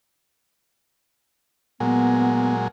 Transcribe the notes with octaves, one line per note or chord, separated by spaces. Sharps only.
A#2 F#3 G#3 B3